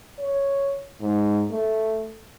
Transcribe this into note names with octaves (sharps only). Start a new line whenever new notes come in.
C#5
G#2
A3